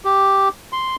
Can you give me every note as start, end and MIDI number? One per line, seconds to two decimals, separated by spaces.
0.05 0.49 67
0.73 0.96 84